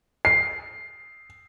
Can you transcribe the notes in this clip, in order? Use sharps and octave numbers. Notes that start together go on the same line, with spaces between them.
C7